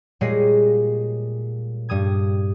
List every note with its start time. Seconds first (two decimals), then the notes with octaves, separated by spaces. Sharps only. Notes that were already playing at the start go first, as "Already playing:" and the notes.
0.21 A#2 G3 G#3 C#5 D#5 C7
1.89 G2 G3 D#6 G#6